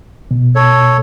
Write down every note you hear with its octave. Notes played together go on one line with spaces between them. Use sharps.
B2
A4 C#5